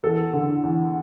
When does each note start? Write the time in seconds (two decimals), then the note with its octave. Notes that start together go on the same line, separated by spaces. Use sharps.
0.03 E2 A4
0.33 D3
0.63 E2